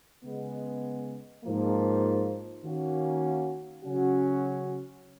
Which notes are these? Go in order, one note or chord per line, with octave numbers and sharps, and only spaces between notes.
C#3 G#3 B3
G#2 F3 A#3
D#3 A#3 C#4 F#4
C#3 F#3 C#4 F#4